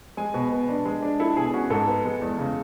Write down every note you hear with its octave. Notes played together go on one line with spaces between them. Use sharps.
G#3 G#5
B2
B3
D4
G#3
D4
E4 A4
B2 G#4
C#4 F#4
G#2 A4
B3
G#3
E2
C#3